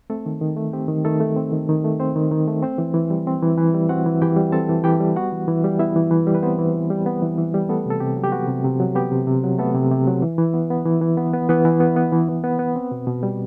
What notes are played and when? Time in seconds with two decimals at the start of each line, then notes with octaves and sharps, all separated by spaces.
0.10 A3 C4 A4
0.26 D#3
0.41 D#3
0.57 A3
0.73 C4 G4
0.88 D#3
1.05 D#3 A3 A4
1.20 A3
1.36 C4
1.52 D#3
1.69 D#3
1.84 A3
2.00 C4 C5
2.15 D#3
2.31 D#3
2.48 A3
2.62 C4 C5
2.78 E3
2.94 E3
3.10 G3
3.27 C4
3.42 E3
3.58 E3
3.74 G3
3.89 C4 F#4 F#5
4.06 E3
4.21 E3 G4 G5
4.37 G3
4.52 C4 A4 A5
4.69 E3
4.84 E3 G4 G5
5.01 G3
5.16 B3 F#4 F#5
5.32 E3
5.48 E3
5.64 G3
5.79 B3 E4 E5
5.96 E3
6.11 E3
6.27 G3
6.34 B4
6.42 B3 C4 C5
6.59 E3
6.74 E3
6.90 G3
7.06 B3
7.22 E3
7.38 E3
7.54 G3
7.69 A3 B3 A4
7.86 C3 A4
8.00 C3 G4
8.16 F#3
8.24 G4
8.32 B3 F#4
8.48 C3
8.64 C3
8.80 F#3
8.95 B3 G4
9.12 C3
9.27 C3
9.44 F#3
9.59 A3 B3 A4
9.75 C3
9.91 C3
10.07 F#3
10.22 E3
10.38 E3
10.54 B3
10.70 B3
10.86 E3
11.01 E3
11.17 B3
11.33 B3
11.49 E3 B3 B4
11.65 E3
11.80 B3
11.96 B3
12.12 E3
12.28 E3
12.44 B3
12.59 B3
12.76 C4
12.92 B2
13.07 B2
13.23 G3